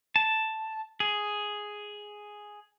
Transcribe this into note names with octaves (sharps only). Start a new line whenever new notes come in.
A5
G#4